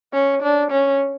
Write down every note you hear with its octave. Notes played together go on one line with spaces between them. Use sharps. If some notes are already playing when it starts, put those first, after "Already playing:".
C#4
D4
C#4